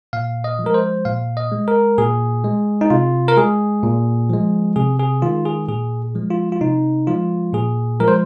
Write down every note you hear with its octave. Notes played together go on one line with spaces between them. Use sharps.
A#2 F5
D#5
F3
G#3 A#4
C5
A#2 F5
D#5
G#3
A#4
A#2 G#4
G#3
D#4
C3 F4
A#4
G#3 G#4
A#2
F3 G#3
C3 G#4
G#4
D#3 G#3 F4
G#4
A#2 G#4
F3 G#3
F4
F4
C3 D#4
F3 G#3 F4
A#2 G#4
F3 G#3 A#4
C5